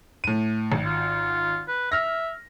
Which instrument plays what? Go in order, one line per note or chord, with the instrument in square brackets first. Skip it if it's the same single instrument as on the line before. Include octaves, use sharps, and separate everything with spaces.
[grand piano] A2 D#7
G#1
[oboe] F4
B4
[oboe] E5 [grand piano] F6 A#6